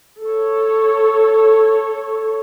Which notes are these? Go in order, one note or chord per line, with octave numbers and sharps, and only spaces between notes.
A4 C#5